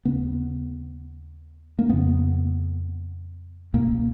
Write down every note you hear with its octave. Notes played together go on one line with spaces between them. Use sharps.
D#2 C#3 B3
A#3
F2 C#3 B3
C#2 B2 A#3